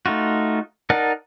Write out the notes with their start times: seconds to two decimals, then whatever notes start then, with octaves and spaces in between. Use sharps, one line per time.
0.06 A3 D#4 F4 F#4
0.90 D#4 A#4 D5 F#5 A5